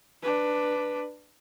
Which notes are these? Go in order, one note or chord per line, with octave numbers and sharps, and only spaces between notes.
D4 B4